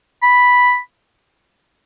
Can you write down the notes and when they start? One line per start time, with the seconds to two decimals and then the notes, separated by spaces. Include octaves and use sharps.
0.23 B5